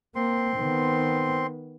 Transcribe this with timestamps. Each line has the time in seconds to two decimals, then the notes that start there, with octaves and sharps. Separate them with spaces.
0.15 A#3 C4 C6
0.57 D#3 B3